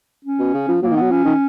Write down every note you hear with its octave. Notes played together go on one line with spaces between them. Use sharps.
C#4
B2
C#3
F3
F#3 A#3
F3
D#3
B3
F#3
F3 C#4
D#3